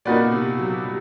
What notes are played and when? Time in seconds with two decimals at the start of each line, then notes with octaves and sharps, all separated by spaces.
0.05 A#2 A#3 D#4 F#4 B4 D5
0.25 B2
0.32 C3
0.59 F#3
0.85 G3